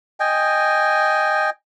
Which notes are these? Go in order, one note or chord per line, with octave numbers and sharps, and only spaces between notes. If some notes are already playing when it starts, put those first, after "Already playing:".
D#5 G5 G#5